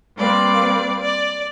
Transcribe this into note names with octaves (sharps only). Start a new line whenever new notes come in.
G3 A#3 C4 B4 D5 D6
D5